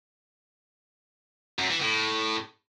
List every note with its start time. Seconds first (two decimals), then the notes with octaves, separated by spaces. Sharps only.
1.59 F#2
1.70 E3
1.82 A2